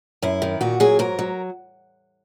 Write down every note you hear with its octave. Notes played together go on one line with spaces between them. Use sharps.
F#2 E4
D#3
A#2 F#4
F#3 G#4
G#2 A#4
F#3